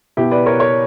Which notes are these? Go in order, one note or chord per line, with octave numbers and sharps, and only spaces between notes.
B2 E4 G4
B4 D5
A#4 C#5
A#4 C#5